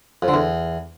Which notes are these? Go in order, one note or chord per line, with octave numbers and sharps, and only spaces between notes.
F2
D3
E2